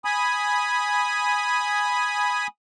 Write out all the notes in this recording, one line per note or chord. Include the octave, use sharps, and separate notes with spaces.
G#5 B5 D#6